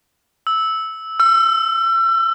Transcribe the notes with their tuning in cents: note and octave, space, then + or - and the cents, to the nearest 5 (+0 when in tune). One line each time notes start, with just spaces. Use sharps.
E6 -10
E6 +35